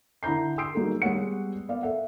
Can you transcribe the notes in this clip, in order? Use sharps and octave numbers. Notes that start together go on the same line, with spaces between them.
D3 E4 A#5 G6 C7
C6 D#6 E6 G6 C7 D7
F#3 G3 A#3 D#4 G#4 A4
G3 G#3 B3 C#5 F#5 C#7
B3 D5 F5
A4 E5 F#5